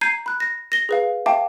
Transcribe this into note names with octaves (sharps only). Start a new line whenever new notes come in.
A#5 G6 G#6 C7 D#7
B5 F#6
A#6
A#6 G7
G#4 B4 F5
E5 F5 G5 A5 D6